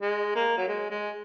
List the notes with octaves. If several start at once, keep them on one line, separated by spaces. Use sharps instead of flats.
G#3
A#3
F#3
G#3
G#3